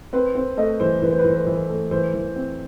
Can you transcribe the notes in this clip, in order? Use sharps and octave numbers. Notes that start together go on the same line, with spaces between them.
C4 B4
C4 C5
A3 D#5
E3 C5
E3 B4
C5
B4
E3 C5
B4
E3 C5
B4
A3
E3 C5
E3
C4